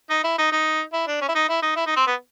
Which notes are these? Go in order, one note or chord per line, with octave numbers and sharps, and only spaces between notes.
D#4
E4
D#4
D#4
E4
D4
C#4
E4
D#4
E4
D#4
E4
D#4
C4
B3